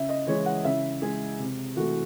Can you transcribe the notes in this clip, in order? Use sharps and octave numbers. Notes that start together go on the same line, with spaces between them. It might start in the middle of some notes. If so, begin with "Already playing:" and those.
Already playing: C#3 E5
D#5
E3 G#3 C#5
F#5
C#3 E5
G#3 G#4
C3
E3 A3 F#4